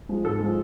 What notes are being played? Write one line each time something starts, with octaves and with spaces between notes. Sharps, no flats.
F3 G#3
G#2 A4
F3 G#3